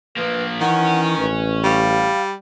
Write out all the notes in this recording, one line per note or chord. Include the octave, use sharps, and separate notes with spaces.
F3 A#3 B4
D#3 E3 C#4 F#5
A1 B4
G3 F5